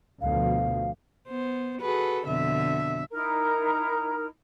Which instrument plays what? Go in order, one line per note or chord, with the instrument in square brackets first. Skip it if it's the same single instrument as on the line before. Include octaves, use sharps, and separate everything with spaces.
[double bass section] D2 B2 F3 [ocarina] F5
[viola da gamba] B3 C5
[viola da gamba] F#4 G#4 A4 [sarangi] B4
[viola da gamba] F2 B2 D3 [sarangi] E5
[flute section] D#4 E4 A#4 A#5